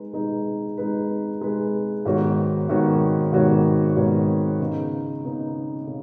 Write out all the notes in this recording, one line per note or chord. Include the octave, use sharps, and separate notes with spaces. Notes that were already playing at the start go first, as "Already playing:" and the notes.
Already playing: G#3 D#4 B4
G#3 D#4 B4
G#3 D#4 B4
G#3 D#4 B4
G#2 D#3 B3 F#4 C#5
G#2 D#3 B3 F#4 C#5
G#2 D#3 B3 F#4 C#5
G#2 D#3 B3 F#4 C#5
C#3 B3 D#4
C#3 B3 D#4
C#3